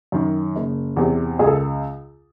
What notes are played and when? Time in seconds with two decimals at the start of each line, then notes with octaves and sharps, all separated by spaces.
0.12 F#2 D#3
0.56 F#1
0.97 E2 C3
1.39 C#2 G#4
1.47 A4